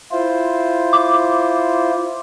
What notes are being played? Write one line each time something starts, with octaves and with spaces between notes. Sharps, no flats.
E4 F4 C5
D6